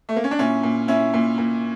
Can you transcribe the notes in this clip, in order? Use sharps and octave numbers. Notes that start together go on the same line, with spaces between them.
A3
A#3
C#4
D4
A#2 C#4 E4
A#2
A#2 C#4 E4
A#2
A#2